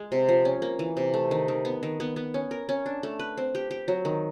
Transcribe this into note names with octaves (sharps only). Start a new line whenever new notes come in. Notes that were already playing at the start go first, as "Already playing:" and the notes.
Already playing: G#3
C3
F3
C#4
A#3
E3
C3
A3
D#3
D#3
B3
D#3
B3
B3
C#4
A#4
C#4
D4
A3
B4
C4
G4
G4
F#3
D#3